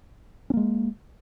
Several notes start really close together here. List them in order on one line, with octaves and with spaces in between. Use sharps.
C#4 A#3 G#3